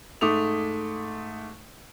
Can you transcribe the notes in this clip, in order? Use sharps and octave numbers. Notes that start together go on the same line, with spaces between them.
G#2 A3 D6 D#6 F7